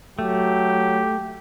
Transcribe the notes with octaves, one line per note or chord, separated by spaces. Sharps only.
F#3 A3 G4